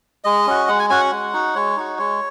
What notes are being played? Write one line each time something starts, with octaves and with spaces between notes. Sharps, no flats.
G#3 D#5
C#4 F#4
G#3 F#5
G#5
C#4 F#4 G#5
F#5
G#3
D#4 F#4
G#3 C#5
D#4 F#4
G#3 C#5